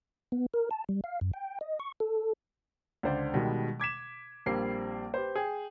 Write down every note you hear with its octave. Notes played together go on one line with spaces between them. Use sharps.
B3
A#4
A5
G3
F5
F#2
G5
D#5
C#6
A4
C#2 D3 C5 D5
B2 D#3 G3 G#3
D6 G#6 B6 E7
A#1 G3 A#3 C4 C7
G4 B4 C5
G#4 G5